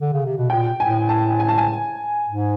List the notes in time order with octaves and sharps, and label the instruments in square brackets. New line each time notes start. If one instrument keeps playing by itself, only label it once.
[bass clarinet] D3
C#3
C3
B2
[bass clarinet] A#2 [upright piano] G5
[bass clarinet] A2 [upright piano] G#5
[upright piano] A5
G#5
A5
G#5
[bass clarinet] G#2